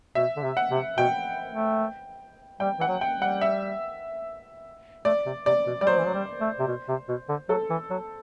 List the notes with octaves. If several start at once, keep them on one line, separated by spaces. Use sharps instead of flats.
B2 E5
D3
C3
F#5
C3
B2 G5
A3
G3 G5
E3 F#5
F#3
G5
G3
F#5
E5
A3 D5
C3
C3 D5
B2
G3 D5
F#3 C5
E3
F#3
G3
A3
C3
B2
C3
B2
D3
F#3 A4
E3
F#3